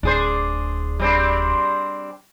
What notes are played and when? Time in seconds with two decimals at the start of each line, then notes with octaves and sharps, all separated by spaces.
0.03 D1 D4 G#4 C5
1.00 G3 C4 D4